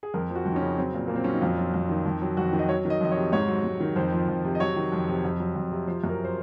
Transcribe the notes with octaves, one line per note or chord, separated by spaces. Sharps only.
G#4
F2 A#4
F3
F#4
F2
D#4
C#4
C#3
F#3 C4
A#2
A#2 A#3
C4
F#3 C#4
D#4
F2 F4
F#3
F2
D#3
F2
F#3
F2 F#4
D#3
D#5
F#3 C#5
D#3
D#5
F2 D#5
C#5
C3
G#2 C#5
F#3
G#2
D#3
F2 C5
F3
F2
C3
D#5
F#3 C#5
D#3
F2
C3
F2
F#3
F2
C3
F3 C5
F#2
A#4
C5